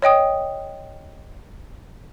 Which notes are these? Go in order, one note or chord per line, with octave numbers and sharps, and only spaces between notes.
C#5 D#5 G5 D#6